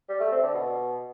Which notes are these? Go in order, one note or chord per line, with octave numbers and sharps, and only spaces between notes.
G3
A3
C4
D3
B2